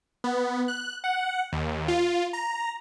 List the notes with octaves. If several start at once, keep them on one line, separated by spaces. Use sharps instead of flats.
B3
F#6
F#5
D#2
F4
A#5